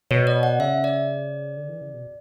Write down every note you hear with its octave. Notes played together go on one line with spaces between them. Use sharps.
B2 C#5
D5
F#5
C#3 E5
D5
D3
E3
C#3
B2